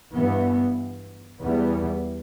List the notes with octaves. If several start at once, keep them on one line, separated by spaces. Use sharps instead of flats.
G2 E3 B3
E2 E3 G3 B3